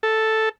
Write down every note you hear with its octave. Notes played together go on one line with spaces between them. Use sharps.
A4